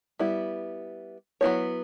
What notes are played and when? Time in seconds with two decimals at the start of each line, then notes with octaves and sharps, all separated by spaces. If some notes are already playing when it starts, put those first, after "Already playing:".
0.19 G3 B3 E4
1.41 F#3 B3 E4 A4 C#5